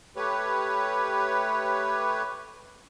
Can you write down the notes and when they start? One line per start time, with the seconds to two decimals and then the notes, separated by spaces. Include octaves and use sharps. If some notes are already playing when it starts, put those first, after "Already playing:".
0.16 A3 G4 B4 C#5